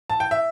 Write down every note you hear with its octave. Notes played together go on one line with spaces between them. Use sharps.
A5
G5
E5